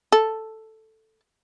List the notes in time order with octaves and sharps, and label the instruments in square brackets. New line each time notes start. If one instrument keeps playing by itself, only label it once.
[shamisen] A4